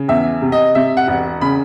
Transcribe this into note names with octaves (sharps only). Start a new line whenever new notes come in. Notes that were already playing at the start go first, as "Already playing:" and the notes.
Already playing: C#3
E2 E5
C3
D#5
C3 E5
F#5
E1
C#3 B5